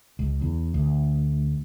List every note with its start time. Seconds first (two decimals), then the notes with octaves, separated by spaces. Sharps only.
0.19 C#2
0.41 E2
0.74 D2